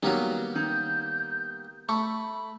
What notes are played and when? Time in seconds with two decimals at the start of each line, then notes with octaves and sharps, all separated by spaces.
0.03 D#3 F#3 G3 A#3 B3
0.55 D#3 G6
1.89 A3 B5 C#6